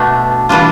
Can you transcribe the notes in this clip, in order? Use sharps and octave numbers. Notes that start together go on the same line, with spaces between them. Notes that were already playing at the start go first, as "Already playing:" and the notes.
Already playing: B2 A3 D4
E3 G3 D4 F4